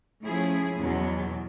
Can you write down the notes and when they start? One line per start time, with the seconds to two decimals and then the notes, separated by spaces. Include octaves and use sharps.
0.23 F3 A3 C#4 E4 G#4
0.80 E2 B2 F#3